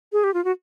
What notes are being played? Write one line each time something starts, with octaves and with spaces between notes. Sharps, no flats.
G#4
G4
F4
F#4